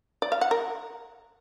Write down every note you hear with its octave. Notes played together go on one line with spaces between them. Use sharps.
D5
F5
F#5
A#4